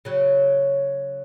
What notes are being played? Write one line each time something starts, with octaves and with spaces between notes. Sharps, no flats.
C#3 F#3